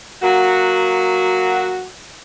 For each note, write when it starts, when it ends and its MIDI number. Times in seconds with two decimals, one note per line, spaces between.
0.22 1.86 54
0.22 1.86 58
0.22 1.86 66